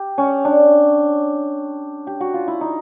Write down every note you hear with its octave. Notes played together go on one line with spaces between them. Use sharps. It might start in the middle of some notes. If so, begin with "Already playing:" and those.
Already playing: G4
C#4
D4
G4
F#4
F4
E4
D#4